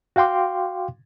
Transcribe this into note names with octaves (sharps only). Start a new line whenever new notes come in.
F#4 F5 G5 C6 D6